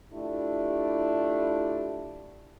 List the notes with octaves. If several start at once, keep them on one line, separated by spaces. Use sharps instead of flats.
A3 D4 E4 F4 G4